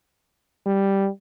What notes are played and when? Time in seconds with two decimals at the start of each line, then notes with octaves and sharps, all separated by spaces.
0.66 G3